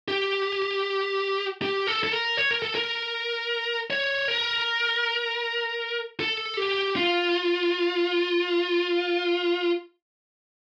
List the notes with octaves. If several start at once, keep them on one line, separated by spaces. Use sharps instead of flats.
G4
G4
A4
A4
A#4
C#5
A#4
A4
A#4
C#5
A#4
A4
G4
F4